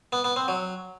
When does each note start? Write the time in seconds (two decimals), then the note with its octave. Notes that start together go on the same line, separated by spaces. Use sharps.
0.13 B3
0.24 B3
0.36 C4
0.48 F#3